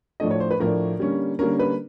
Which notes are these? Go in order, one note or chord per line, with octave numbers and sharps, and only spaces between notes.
A2 F3 A3 D4 D#5
C#5
C5
B4
A2 F3 A3 D4 A#4
D3 G3 A#3 C#4
D3 G3 A#3 C#4 A#4
B4